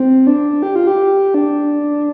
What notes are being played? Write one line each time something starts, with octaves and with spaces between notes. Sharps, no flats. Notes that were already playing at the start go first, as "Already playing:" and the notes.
Already playing: C4
D4
G4
F4
G4
D4